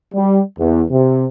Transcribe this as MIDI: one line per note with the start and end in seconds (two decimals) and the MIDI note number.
0.15 0.41 55
0.59 0.82 40
0.91 1.26 48